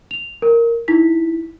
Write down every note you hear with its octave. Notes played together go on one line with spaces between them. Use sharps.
F7
A#4
D#4 E4 B6